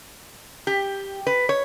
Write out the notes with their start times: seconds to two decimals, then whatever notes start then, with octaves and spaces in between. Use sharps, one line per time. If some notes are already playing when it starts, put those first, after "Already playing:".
0.67 G4
1.27 B4
1.49 C#5